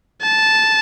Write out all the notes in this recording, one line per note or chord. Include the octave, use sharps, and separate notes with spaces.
A5